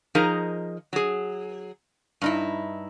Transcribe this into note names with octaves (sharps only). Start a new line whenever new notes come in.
F3 D#4 G#4 A#4 D#5 A#5
F#3 G#4
G2 D#4 E4